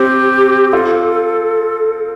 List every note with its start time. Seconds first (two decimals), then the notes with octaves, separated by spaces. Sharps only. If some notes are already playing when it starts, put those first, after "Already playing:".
Already playing: C4 G4
0.72 F4 A4